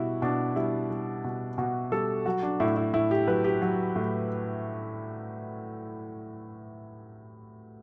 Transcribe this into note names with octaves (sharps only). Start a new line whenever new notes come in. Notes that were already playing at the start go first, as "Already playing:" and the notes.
Already playing: B2 G3 E4 F#4
B2 D4
G3 E4
G3
B2
B2 F#4
G3 A4
F#3 F#4
D4
A2 E4
E4
A2 E4
G4
F#3 B4
G4
F#3
A2